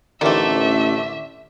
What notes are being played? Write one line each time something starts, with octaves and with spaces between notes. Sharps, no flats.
A1 D3 D#3 A3 A#3 C4 E5